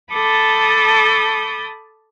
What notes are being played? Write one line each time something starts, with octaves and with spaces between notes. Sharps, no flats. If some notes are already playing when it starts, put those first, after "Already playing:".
A4 A5 B5 D6 D#6 G6